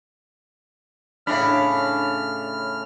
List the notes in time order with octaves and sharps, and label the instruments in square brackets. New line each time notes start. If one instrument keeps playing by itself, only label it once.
[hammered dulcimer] A2 C#3 B5 [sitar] D4 [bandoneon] F6